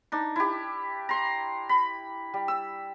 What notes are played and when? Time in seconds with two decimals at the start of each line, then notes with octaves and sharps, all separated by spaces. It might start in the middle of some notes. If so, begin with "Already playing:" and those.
0.12 D4 D#4
0.36 E4 G4
1.09 A#5 C6
1.69 B5
2.34 G3
2.48 E6